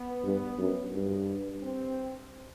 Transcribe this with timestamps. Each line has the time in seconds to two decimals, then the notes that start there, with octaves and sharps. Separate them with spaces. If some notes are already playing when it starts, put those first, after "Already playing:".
Already playing: B3
0.24 G2
0.59 F#2
0.94 G2
1.62 C4